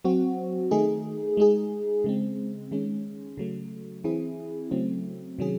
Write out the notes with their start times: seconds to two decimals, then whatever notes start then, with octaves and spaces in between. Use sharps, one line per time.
0.05 F#3 C4 F#4
0.71 D#3 A3 D#4 G#4
1.37 G#3 D#4 G#4
2.04 C#3 G#3 C4
2.71 D#3 G#3 C#4
3.38 C#3 F#3 A3
4.04 E3 C4 E4 G#4
4.71 C#3 F#3 A3 C4
5.39 C3 D#3 F#3 C#4 G#4